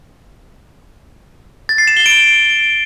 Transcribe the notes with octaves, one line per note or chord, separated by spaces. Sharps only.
A6
C7
E7
G7
D7